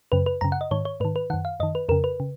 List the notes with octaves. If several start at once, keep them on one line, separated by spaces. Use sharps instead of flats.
F#2 C#3 B4
B4
F#2 C#3 A#5
F#5
D#5
G#2 D#3 C#5
C#5
G#2 D#3 B4
B4
F#2 D#3 F#5
F5
F#2 D#3 D#5
B4
F2 C#3 A#4
B4
C#3